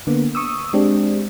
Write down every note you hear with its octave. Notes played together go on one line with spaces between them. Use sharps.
D3 A#3 B3
C#6 D#6 E6
G#3 C4 D4 G4